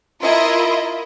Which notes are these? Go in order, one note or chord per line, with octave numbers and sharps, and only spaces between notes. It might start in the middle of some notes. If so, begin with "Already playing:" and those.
E4 F4 A#4 D#5 E5